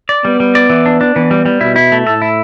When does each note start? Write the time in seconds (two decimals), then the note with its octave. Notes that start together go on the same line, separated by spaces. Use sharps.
0.09 D5
0.25 G3 B3
0.40 G3
0.55 D5
0.70 E3
0.86 D4
1.01 D4
1.16 E3 B3
1.31 G3
1.46 G3
1.61 B2 E4
1.76 E4
1.92 A3
2.06 A2 A4
2.22 E4